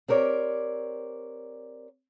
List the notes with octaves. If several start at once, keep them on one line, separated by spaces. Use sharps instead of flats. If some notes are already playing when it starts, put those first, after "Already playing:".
C4 G4 A#4 C#5 D5